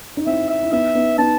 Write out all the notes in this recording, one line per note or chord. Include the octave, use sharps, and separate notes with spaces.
D#4
C4 E4 E5
E5
E4
B3 D#4 E5
B3 D#4
B3 D#4 A5